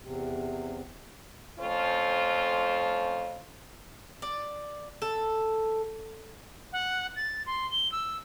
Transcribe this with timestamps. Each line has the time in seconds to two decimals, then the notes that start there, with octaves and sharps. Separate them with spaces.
0.03 E2 C3
1.59 F2 A3 C#4 F4 C5
4.22 D5
5.02 A4
6.73 F#5
7.16 A6
7.46 C6
7.71 G7
7.92 E6